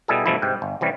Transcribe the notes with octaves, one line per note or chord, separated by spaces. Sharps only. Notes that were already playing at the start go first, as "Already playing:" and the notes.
B2 G3 E4 G#4 A4
G2 B2 E3 F3 A3 E4
G#2 C3 G5
G1
C3 E3 G3 C#4